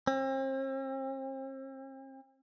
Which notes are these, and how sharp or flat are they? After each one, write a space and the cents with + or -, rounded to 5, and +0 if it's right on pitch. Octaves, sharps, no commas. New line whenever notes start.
C4 +40